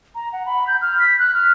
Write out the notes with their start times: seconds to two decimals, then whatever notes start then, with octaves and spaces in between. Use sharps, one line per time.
0.15 A#5
0.33 F#5
0.46 B5
0.67 G6
0.82 F6
0.99 B6
1.19 F#6
1.34 F6